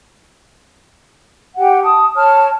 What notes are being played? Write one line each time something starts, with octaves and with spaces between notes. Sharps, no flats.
G4 F#5 G5
A5 D#6
C#5 A5 F6